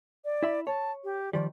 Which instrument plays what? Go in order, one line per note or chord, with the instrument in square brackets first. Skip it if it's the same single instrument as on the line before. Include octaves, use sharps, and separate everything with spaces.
[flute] D5
[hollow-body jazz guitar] E4 E5 B5
[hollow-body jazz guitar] C#5 [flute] A5
[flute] G4
[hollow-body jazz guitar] D#3 F3 G3 [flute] D5